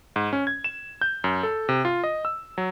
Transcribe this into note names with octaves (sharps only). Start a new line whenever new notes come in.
G#2
C#4
G#6
E7
G6
F#2
A4
C3
F4
D#5
E6
F#3